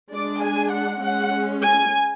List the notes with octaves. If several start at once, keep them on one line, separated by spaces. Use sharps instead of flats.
G#3 D4 D5
G#5
F#5
G#3 C#4 F#5
G#5